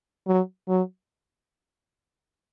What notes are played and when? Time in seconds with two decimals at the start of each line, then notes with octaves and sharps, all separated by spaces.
0.27 F#3
0.68 F#3